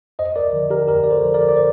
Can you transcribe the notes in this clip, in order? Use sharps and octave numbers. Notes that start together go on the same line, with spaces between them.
F2 C5 D#5
A#4 D5
D3 F3
G4 A#4
F2 G4 A#4
D5
A4 C5
D3 F3
A#4 D5
D5
C5